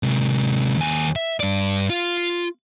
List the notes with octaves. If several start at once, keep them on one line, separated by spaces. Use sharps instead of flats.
C3 G#3
D#2 G#5
E5
G2 D5
F4